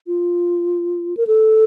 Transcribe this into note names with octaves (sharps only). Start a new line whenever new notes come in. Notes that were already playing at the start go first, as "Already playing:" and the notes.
F4
A#4
A4